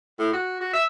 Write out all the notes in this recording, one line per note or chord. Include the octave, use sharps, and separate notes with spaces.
A2
F#4
F#4
E5